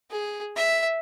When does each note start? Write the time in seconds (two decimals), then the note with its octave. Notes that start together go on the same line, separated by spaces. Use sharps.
0.11 G#4
0.56 E5